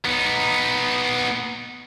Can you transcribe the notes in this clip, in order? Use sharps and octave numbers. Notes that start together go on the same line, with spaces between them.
B3 D#4